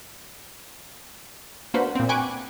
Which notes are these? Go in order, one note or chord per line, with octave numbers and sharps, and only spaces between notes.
A#3 B3 D4 F#4 B4 C5
A#2 C4
G5 G#5 B5 C#6 D6 F#6